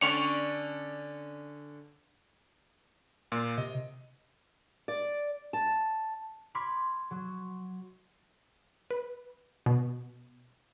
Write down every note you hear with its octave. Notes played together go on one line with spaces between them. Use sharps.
D3 C#4 A5 C#6 D6 C#7 F7
A#2 F4
C3 D#5
D5
A5
B5 C6 D6 F6 G#6 B6
F#3
B4
B2